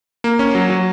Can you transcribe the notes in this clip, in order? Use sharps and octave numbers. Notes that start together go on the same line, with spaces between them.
A#3
C#4
F#3
F#3